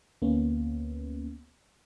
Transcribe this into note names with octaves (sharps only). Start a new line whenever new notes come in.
D2 A#3 B3 C#4